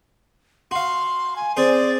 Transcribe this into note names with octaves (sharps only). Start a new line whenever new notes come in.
F#4 F5 C6
G#5
C4 G#4 C5 D5